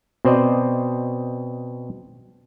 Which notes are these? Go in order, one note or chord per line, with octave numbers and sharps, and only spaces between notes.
B2 C4 C5 D5 D#5